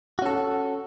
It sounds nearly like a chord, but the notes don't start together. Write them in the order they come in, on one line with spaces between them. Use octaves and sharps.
F#4 C#4 A4